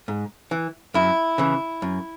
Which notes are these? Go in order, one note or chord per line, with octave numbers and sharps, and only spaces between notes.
G#2
E3
F#2 E4
C#3 E3
F#2